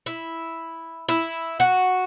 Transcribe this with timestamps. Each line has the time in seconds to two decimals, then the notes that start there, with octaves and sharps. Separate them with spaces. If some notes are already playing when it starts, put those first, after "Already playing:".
0.06 E4
1.09 E4
1.60 F#4